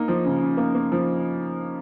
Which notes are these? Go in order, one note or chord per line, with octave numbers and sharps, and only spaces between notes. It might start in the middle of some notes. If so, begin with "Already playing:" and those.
Already playing: A#3 D#4
F3
C#3
C#3
A#3
A#3
F3